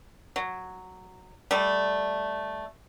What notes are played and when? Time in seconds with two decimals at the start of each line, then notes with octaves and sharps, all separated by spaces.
0.36 F#3
1.51 G3 A3